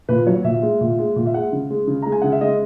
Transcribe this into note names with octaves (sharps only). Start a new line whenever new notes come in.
A#2 B4
F#3 C#5
A#2 E5
G#3
A#2
G#3
A#2
E5
G#3 F#5
C#3
G#3
C#3
G#3 A#5
G#5
C#3 F#5
E5
G#3 D#5